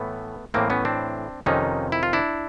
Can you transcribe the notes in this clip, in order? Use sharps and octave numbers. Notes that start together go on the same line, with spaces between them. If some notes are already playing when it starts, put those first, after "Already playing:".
Already playing: A2 E3 A3 B3
A2 E3 A#3 C4
B3 C#4
C4 D4
F2 C3 D#3 C#4 D#4
E4
F4
D4 E4